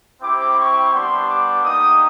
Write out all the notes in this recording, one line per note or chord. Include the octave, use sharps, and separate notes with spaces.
C4 E4 G4 D6
C#6
G3 B3 D4 C6
D6
A#3 D#4 G4 D#6